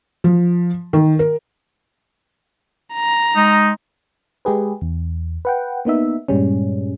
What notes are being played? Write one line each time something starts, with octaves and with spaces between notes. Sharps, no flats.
F3
D#3
A#4
A#5
G#3 D#4
G#3 G4 G#4 B4
E2
B4 F#5 G5
A#3 B3 D#4 E5
G2 A#2 G3 G#3 C#4